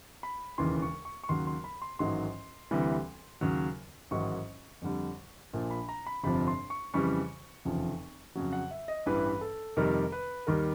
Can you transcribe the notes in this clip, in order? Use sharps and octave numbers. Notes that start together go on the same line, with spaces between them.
B5
E1 D#2 C#3 E3 C6
C#6
C#6
C#6
D#2 C#3 F#3 C6
C6
B5
C6
A1 G#2 D#3 F#3 C6
D2 C3 E3 G3
D#2 C#3 F#3
A1 G#2 D#3 F#3 C#6
F2 D3 G3
A#1 A#2 F3
B5
A#5
B5
G1 F2 C3 F3 B5
C6
C#6
F2 C#3 E3 G3 C#6
F1 E2 C#3 F3
F2 C#3 F#3
F#5
E5
D#5
A1 G2 E3 G3 B4
A4
F2 C3 D#3 G3 A#4
B4
D#2 D#3 G3 A#4